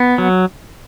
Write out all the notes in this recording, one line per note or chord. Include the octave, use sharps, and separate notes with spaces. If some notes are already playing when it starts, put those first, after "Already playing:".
Already playing: B3
F#3